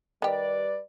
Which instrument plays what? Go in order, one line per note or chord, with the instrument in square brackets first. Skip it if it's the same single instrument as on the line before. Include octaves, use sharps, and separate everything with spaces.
[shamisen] D#3 G4 [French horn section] G3 B4 D5